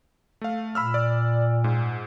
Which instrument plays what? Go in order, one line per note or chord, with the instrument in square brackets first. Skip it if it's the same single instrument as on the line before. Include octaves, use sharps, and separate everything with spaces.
[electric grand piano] A3 F5
[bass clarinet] A#2 [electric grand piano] B5 E6 F6
[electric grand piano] D5
G#2